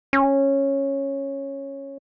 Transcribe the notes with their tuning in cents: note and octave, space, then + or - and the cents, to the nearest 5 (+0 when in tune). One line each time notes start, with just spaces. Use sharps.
C#4 -10